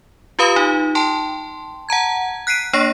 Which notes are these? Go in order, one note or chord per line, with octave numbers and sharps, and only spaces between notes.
F4 G4 B4 F5 B5 D#6
D#4
G5 A5 C6
F#5 A5 A#5 G#6
F#6 B6 C7 D7 D#7
A#3 D4 C#5 C#6 A#6 C7